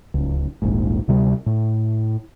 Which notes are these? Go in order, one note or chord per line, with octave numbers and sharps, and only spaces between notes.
D1 C#2
D#1 A#1 G#2
D2 C3 G3
A2